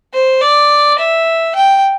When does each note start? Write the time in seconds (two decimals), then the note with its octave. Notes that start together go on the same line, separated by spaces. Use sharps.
0.13 C5
0.41 D5
0.99 E5
1.56 G5